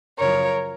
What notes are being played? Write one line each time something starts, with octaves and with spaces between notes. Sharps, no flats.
F#2 C#3 F3 A#4 C#5